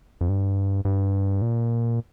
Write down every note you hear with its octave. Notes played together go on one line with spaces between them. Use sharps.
F2
G2
G2
A#2